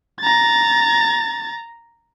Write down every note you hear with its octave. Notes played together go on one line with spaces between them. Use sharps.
A#5 A6